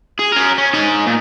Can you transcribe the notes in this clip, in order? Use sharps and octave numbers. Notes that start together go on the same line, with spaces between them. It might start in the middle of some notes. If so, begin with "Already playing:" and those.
G#4
C#4 A#4
C#4
D#4 G#5
A#2